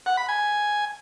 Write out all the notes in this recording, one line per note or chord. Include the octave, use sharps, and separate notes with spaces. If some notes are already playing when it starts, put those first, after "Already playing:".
F#5
B5
G#5